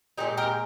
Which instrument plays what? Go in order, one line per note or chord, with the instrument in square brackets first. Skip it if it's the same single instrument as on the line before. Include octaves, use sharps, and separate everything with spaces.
[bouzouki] A#2 G#3 D#4 G4
G4 A#4